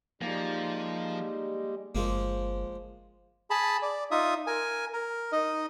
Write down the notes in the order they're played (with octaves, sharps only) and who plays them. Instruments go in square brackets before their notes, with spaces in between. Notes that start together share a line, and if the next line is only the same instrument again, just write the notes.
[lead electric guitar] F3 [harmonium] G3 G#3 [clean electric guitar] A#3 [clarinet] D#4
[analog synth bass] G1 [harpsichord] F3 G#3 A#3
[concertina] G#4 A5 B5
D5
D#4 F4 E5 D#6
A#4 G#5
A#4
D#4 D#5